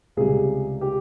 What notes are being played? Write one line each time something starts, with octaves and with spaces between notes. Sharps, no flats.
C#2 C3 G3 G#4
G4